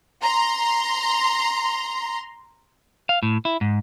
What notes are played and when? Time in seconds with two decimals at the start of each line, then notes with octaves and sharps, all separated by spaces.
0.23 A#5 C6
3.09 F5
3.23 A2
3.45 E4
3.61 G#2